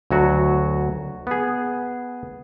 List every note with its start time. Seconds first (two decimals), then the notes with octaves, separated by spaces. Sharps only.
0.11 D2 F#3 F#4
1.27 B3 G#4